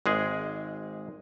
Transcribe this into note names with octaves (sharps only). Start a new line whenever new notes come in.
G#1 G#3 G#4